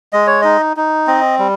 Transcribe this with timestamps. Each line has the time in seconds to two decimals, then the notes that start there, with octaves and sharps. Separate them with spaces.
0.13 G#3 D#5
0.27 C#5
0.42 D#4 D#5
0.77 D#4
1.07 C4 D#5
1.39 G3